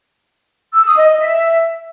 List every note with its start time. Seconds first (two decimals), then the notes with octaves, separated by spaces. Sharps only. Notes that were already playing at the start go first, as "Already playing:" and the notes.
0.74 E6
0.85 D#6
0.97 D#5
1.09 D#5
1.20 E5